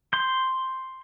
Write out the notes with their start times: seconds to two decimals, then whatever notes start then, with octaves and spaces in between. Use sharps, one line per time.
0.13 C6 G6